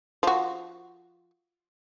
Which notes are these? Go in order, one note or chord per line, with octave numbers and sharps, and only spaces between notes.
F3 F#4